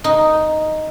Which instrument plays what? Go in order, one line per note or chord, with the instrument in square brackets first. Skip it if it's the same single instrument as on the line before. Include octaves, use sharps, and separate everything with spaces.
[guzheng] D#4